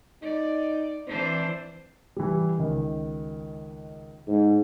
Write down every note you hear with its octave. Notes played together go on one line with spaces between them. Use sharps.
D#4 D5
E3 C4 D4 C5
E3 G3
C#2 D#3
G#2